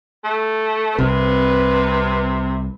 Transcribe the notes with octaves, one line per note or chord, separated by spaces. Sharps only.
A3
C2 C3 B4